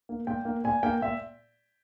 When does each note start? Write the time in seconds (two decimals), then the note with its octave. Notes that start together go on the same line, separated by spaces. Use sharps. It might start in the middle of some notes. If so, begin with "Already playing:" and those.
0.09 A#3
0.27 A#2 G5
0.45 A#3
0.64 A#2 G#5
0.83 A#3 G5
1.02 A#2 E5